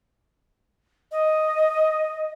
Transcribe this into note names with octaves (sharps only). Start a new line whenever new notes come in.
D#5